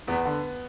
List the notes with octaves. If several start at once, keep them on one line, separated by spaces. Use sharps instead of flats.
E2 B3
D3